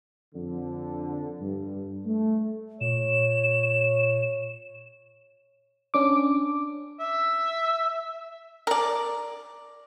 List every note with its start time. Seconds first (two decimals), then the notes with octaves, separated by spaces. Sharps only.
0.35 F2 D3
1.40 G2
2.06 A3
2.81 A#2 C#5 E7
5.94 C#4 D4 D6
7.00 E5
8.67 A#4 D5